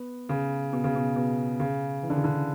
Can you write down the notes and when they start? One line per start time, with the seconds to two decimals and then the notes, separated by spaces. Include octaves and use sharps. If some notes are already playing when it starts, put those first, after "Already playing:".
Already playing: B3
0.29 C#3
0.73 B2
0.84 C#3
0.96 B2
1.16 B2
1.60 C#3
2.03 E3
2.10 D3
2.17 C#3
2.24 D3